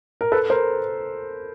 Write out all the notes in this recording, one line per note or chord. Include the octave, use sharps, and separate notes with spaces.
A#4
A4 B4
A#4 C5